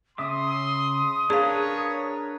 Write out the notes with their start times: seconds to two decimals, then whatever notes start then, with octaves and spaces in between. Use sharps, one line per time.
0.18 C#3 E5 C6 D6 D#6
1.30 D4 G#4 A#4 B4 C#5 F5